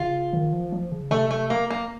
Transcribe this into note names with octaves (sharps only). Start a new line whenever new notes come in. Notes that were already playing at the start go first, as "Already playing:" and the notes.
Already playing: C#3 F4
D#3
F3
F3
C#3
C3 A3
A3
A#3
A#3